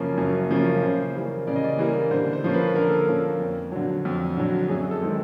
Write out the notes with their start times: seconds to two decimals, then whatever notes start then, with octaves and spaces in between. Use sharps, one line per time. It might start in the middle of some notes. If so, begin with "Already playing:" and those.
Already playing: F#2 C#3 F3 A#3 C#4
0.18 F#2
0.50 C#3 F3 A#3 C#4
0.82 C#3 C5
1.15 E3 G3 A#3
1.47 C#3 D5
1.56 D#5
1.64 D5
1.79 E3 G3 A#3
2.11 D3 C5
2.33 C5
2.44 F3 A#3 C#4
2.54 B4
2.75 D3 A#4
2.89 A4
3.02 A#4
3.08 F3 A#3 C#4
3.40 F2
3.72 D3 F#3
4.05 F2
4.37 D3 F#3
4.68 F#2 G#4
4.91 A4
5.02 D#3 G#3 C4